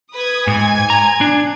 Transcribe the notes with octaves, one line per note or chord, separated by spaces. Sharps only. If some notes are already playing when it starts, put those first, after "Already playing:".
B4 D#6 G#6
G#2 G#5 G#6
A#5
D4